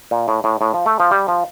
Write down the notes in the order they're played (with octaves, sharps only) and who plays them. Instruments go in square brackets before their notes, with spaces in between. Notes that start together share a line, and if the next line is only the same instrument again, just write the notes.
[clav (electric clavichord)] A#2
A2
A2
A2
F3
A3
F3
G3
F3